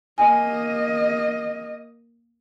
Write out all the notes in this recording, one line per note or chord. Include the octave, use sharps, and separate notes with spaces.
A#3 D#5 G#5